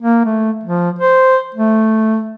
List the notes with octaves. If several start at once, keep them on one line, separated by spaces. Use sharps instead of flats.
A#3
A3
F3
C5
A3